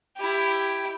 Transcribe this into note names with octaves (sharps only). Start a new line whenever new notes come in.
E4 G4